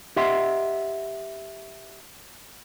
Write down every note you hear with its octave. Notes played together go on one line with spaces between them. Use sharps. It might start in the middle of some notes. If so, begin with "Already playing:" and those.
G4 D#5 E5 F#5 C6